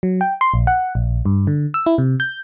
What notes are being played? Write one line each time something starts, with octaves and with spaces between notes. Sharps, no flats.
F#3
G5
C6
A#1
F#5
A#1
G2
D3
E6
E4
C3
G6